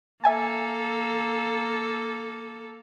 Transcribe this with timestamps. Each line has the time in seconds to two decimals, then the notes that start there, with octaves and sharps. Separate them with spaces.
0.24 A#3 A4 E5 G#5 A5